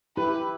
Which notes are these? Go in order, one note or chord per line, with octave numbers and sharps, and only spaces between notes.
E4 G4 B4